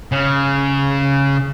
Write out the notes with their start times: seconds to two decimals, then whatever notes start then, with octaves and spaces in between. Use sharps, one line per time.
0.12 C#3